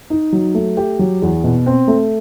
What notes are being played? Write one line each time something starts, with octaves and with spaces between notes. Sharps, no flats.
D#4
F#3
A3
G4
F#3
E2
B2
C4
A3